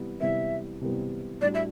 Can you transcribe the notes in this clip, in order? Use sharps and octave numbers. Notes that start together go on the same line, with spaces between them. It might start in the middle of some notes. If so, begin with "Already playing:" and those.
Already playing: C3 E3 G3 B3
C3 E3 G3 B3 E5
C3 E3 G3 B3
A2 G3 D4 F#4 D5
E5